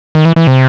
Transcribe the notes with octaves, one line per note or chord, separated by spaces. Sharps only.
D#3
E3
E3
C3